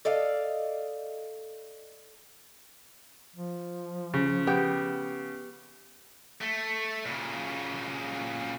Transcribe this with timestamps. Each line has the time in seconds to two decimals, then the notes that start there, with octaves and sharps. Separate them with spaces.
0.05 A4 D5 D#5 F5
3.35 F3
4.14 C#3
4.47 B3 G4
6.41 A3
7.06 A#2 C#3